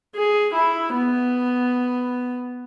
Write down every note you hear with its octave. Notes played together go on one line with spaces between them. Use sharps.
G#4
E4
B3